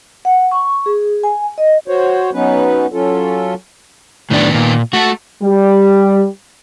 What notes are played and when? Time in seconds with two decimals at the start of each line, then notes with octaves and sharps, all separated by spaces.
0.25 F#5
0.51 C#6
0.86 G#4
1.23 G#5
1.58 D#5
1.88 F#4 C5 C#5
2.33 F#3 B3 C#4 D#4 B4
2.92 F#3 C#4 F4 A4
4.30 A2 D#3 B3 D4
4.55 A#2
4.93 A3 F#4 A4
5.42 G3